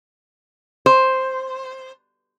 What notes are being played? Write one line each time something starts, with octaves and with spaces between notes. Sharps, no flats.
C5